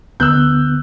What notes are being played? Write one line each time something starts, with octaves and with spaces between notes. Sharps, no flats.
D2 D3 B3 E6 F#6 G6